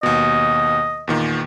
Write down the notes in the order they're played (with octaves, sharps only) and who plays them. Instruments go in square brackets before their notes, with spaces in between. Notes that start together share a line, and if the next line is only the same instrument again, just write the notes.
[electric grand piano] D#2 B2 [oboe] D#5
[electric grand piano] E2 A#2 D#3